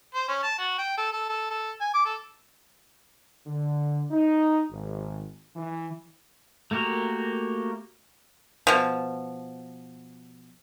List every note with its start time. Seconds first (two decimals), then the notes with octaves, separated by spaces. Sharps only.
0.14 C5
0.28 C#4
0.43 A5
0.58 F#4
0.78 G5
0.97 A4
1.13 A4
1.29 A4
1.50 A4
1.80 G#5
1.94 D6
2.05 A4
3.46 D3
4.11 D#4
4.71 G#1
5.56 E3
6.71 A3 A#3 F#4 G4 A#4
8.67 B2 F3